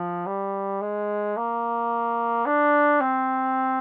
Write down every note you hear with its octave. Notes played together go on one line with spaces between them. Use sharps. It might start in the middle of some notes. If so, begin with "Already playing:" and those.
Already playing: F3
G3
G#3
A#3
D4
C4